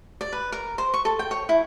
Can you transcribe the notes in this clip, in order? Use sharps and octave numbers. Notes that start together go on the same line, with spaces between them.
D5
B4
A#4
C5
C#6
A4
G5
C#5
E4